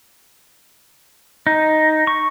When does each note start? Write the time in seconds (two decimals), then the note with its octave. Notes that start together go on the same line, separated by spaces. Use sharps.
1.47 D#4
2.07 C#6